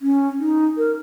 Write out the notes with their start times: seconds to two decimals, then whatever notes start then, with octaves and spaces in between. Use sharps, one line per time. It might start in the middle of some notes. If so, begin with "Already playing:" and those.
0.02 C#4
0.40 D#4
0.77 A#4